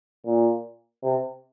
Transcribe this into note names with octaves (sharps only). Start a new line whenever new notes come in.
A#2
C3